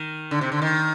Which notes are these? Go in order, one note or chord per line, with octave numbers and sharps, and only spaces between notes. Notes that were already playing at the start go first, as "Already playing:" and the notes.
Already playing: D#3
D3
C3
D3
D#3